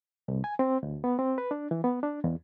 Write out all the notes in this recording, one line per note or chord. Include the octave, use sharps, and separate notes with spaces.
C2
G#5
C4
D2
B3
C4
B4
D4
E3
B3
D4
E2